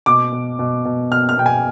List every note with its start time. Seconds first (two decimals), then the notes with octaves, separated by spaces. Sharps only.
0.06 B2 D6
0.32 B2
0.59 B2
0.85 B2
1.11 B2 F6
1.29 F6
1.37 B2 G5
1.46 G#5